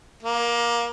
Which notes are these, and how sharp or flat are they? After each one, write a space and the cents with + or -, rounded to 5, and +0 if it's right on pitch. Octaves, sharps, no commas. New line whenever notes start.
A#3 +20